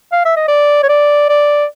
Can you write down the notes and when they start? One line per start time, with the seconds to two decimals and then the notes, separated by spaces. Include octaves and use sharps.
0.12 F5
0.25 E5
0.36 D#5
0.48 D5
0.83 C#5
0.89 D5
1.29 D5